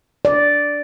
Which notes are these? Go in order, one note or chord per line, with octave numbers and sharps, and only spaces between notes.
D5